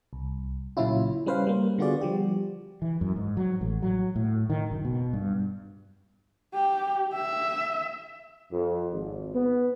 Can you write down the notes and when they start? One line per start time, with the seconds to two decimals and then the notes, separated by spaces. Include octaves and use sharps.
0.13 C2
0.77 A#2 C#3 F#3 C#4 E4 F4
1.26 G3 C#4 B4 C5 F5
1.47 G3 A#3
1.78 D3 B3 F4 F#4 G#4 D5
2.01 F3 G3 G4
2.82 E3
3.01 F#2
3.16 G#2
3.37 F#3
3.61 A1
3.82 F#3
4.16 A2
4.50 D#3
4.71 F#1
4.85 B2
5.13 G2
6.54 G4
7.14 E5
8.50 F2
8.92 G#1
9.33 B3